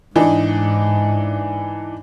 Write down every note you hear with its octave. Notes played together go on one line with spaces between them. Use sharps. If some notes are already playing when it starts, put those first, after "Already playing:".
G#2 E3 D4 D#4